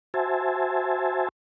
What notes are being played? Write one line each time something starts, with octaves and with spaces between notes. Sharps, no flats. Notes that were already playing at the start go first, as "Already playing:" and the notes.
F#4 C5 E5 G#5 A5